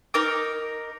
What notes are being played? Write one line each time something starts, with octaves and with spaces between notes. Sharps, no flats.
D#4 A#4 D6